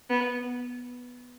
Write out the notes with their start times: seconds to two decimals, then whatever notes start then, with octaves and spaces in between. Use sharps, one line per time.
0.10 B3